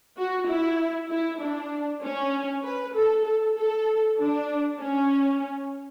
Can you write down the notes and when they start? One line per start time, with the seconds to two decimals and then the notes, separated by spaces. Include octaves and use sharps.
0.17 F#4
0.49 E4
1.10 E4
1.41 D4
2.02 C#4
2.64 B4
2.94 A4
3.24 A4
3.56 A4
4.17 D4
4.79 C#4